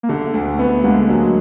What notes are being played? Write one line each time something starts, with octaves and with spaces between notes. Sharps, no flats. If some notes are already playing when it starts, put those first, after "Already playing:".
A#3
D3 A3
D2
A3 B3
A3
D3 G#3 A#3
F#3 G#3 A#3